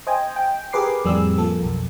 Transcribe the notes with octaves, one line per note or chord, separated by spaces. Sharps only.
C5 D#5 G5 G#5
G5
G4 G#4 A#4 B4 D6 C7
F2 A2 G3 C4 G#4 E6
F3 A#3 A4
B1 F2